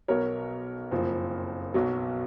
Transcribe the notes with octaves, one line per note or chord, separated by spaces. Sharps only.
B1 B2 F#3 A#4 C#5
F#1 F2 F3
B1 B2 F#3